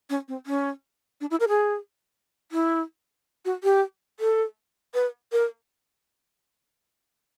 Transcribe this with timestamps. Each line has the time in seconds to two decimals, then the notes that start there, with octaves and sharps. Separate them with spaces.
0.10 C#4
0.28 C4
0.46 C#4
1.21 D4
1.31 E4
1.40 A#4
1.49 G#4
2.52 E4
3.45 F#4
3.64 G4
4.20 A4
4.94 B4
5.32 A#4